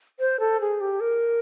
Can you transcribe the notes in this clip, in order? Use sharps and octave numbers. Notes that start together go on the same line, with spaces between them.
C5
A4
G#4
G4
A#4